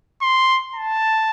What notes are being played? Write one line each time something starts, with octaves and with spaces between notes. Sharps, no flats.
C6
A5